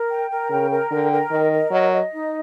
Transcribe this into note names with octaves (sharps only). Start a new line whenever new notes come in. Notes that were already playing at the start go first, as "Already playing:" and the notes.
Already playing: A#4
G5
A#4
C#3 G5
A#4
D3 G5
A#4
D#3 D#5
A#4
F#3 D#5
D#5
D#4